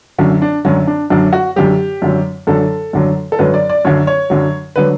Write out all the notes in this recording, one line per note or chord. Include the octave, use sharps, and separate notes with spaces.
F#2 D3 F#3 C#4
D4
F#2 D3 F#3 C#4
D4
F#2 D3 F#3 D4
F#4
F#2 D3 F#3 G4
F#2 D3 F#3
F#2 D3 F#3 A4
F#2 D3 F#3
A4
F#2 D3 F#3 B4
D5
D5
F#2 D3 F#3 C#5
C#5
F#2 D3 F#3
D3 F#3 B4